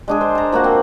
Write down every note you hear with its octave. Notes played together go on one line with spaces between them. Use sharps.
G#3 D4 G#4
C5
A5 A#5
F3 A#3 F#4 F#5
C4